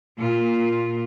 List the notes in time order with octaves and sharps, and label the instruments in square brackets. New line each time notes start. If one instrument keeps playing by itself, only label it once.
[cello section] A#2 F4